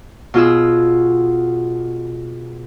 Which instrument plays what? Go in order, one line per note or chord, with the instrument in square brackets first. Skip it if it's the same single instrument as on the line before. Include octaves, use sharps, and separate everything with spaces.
[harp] B2 F4 G#4 E6